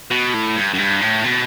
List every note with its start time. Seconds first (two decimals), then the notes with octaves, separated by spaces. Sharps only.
0.11 B2
0.34 A2
0.56 G2
0.74 F#2
0.78 G2
1.01 A2
1.24 B2